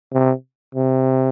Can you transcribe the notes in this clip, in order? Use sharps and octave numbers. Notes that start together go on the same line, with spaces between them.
C3
C3